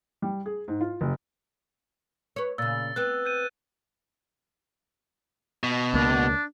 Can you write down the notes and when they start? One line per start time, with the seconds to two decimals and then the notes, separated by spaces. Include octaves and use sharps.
0.22 G3
0.46 G#4
0.68 G#2
0.81 F4
1.01 F#1
2.36 B4 C#5
2.58 A#2 C#3 E6 A6
2.96 B3 C4 F#6
3.26 G6 D#7
5.63 B2
5.94 C#2 A#3 D4